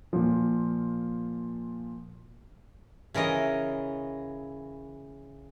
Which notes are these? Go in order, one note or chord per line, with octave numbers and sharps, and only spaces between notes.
A#2 F3
C#3 E3 A#4 D#5